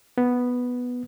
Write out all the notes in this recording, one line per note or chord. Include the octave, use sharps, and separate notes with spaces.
B3